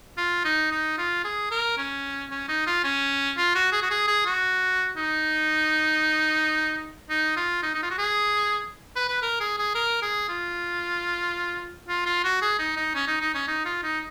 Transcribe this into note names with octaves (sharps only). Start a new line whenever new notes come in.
F4
D#4
D#4
F4
G#4
A#4
C#4
C#4
D#4
F4
C#4
F4
F#4
G#4
F#4
G#4
G#4
F#4
D#4
D#4
F4
D#4
D#4
F4
F#4
G#4
B4
B4
A#4
G#4
G#4
A#4
G#4
F4
F4
F4
F#4
G#4
D#4
D#4
C#4
D#4
D#4
C#4
D#4
F4
D#4